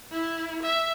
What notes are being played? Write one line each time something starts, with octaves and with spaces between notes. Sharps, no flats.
E4
E5